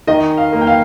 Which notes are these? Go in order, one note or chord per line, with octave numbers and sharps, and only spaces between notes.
D#3 D#5
F5
A#3
G5
F5